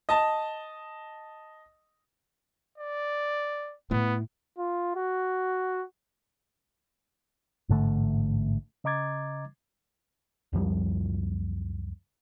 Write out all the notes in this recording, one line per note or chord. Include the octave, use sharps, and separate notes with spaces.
D#5 A5
D5
A2 B3
F4
F#4
A1 G#2 D3 A3
C#3 D#5 A#5 D6 G#6 A6
C#2 F#2 F3 G3